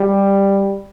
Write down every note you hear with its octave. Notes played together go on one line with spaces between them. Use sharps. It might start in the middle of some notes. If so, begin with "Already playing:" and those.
Already playing: G3